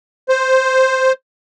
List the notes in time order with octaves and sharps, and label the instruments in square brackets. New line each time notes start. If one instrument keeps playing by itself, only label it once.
[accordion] C5